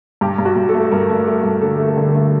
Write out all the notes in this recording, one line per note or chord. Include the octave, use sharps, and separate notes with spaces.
G2 G4
G2
F#4
G2
A4
A3
G2 A#4
A3
A3
G2
D3 A4
A3
A#4
D3
A4
A3